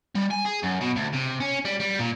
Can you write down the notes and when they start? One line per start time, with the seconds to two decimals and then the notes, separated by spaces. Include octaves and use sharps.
0.15 G3
0.31 G#5
0.45 G#4
0.63 F#2
0.81 B2
0.97 D2
1.14 C3
1.40 C#4
1.65 G3
1.80 G3
1.99 A#2